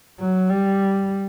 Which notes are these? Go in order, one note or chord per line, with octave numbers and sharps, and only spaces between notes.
F#3
G3